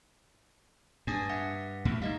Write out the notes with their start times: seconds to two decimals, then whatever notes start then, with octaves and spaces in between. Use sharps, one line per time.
1.07 G2 D4 G#5 D#6
1.29 E5 F#5
1.85 D2 A2
2.02 G3 D#4 D#5 F5